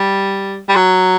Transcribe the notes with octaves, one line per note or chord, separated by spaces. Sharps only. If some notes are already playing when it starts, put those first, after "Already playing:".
Already playing: G3
G3
F#3